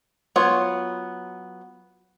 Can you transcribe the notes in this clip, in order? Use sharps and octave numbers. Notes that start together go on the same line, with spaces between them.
F#3 B3 F4 C#5